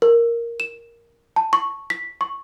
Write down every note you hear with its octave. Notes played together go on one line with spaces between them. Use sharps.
A#4
E7
A5
C#6
B6
C#6